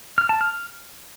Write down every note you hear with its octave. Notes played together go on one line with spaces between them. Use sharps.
F6
A5
F6